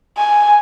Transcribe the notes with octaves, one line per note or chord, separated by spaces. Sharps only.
G#5